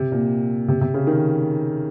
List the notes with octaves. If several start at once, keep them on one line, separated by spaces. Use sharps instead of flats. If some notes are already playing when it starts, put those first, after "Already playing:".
Already playing: C3
A#2
C3
C3
C#3
D#3